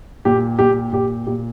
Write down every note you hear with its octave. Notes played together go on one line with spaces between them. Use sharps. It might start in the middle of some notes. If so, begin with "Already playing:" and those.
A#2 G4
A#2 G4
A#2 G4
A#2 G4